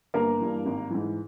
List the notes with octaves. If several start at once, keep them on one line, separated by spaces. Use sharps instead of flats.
G1 A#3 A#4
G2 E3
G#1
G#2 E3